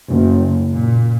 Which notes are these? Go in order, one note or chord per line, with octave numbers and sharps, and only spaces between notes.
F#1
A#2